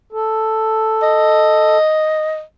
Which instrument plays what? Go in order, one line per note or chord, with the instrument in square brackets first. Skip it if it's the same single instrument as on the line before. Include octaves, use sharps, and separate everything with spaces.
[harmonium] A4
[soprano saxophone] D#5